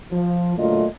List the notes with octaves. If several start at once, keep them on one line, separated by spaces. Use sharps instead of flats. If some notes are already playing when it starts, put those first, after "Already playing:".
F3
A#2 D3 F#3 A3 F4 D#5